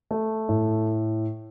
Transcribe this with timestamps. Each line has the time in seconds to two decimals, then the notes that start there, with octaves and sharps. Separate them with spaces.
0.11 A3
0.49 A2